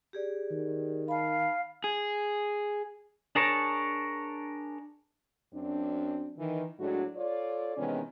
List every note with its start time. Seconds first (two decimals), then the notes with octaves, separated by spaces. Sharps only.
0.13 G4 G#4 D5
0.51 D#3
1.08 F5 A5 B5
1.84 G#4
3.35 D4 G#4 A#4 C#5 A5
5.54 F#2 F#3 C4 D4
6.38 D#3 E3
6.79 A2 F#3 G#3 A3 D4 F#4
7.16 F4 A4 C#5 D5
7.77 C3 D#3 E3 G#3 B3 C#4